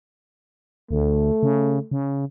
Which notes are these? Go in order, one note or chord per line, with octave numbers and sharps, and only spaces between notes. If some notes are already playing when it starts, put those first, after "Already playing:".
D2 A3
C#3
C#3